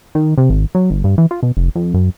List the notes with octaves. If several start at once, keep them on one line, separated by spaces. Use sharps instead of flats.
D#3
C3
G#1
F#3
G1
G2
E3
F4
B2
F1
F2
F#2